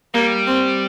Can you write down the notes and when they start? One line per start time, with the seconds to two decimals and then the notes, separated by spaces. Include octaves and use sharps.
0.14 G3 A#3
0.47 C4